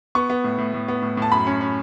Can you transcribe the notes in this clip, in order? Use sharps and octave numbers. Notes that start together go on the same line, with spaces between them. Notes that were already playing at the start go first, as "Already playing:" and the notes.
B3 C#6
B3
A2
A2
A2
B3
A2
A2 A5
F#2 B5
C#4
C#4